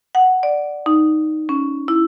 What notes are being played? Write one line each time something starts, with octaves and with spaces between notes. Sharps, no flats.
F#5
D5
D#4
C#4
E4